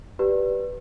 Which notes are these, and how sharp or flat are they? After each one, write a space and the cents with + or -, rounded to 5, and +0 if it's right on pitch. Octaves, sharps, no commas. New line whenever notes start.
G4 -10 B4 -5 D5 +0